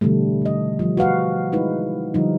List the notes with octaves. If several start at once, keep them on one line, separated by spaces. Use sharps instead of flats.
B2 D3 E3 G3 A3
D#3 D#5
F3 G3
F#4 B4 F5 F#5
G#3 D#4 E4 B4
D3 F3 G3 D#4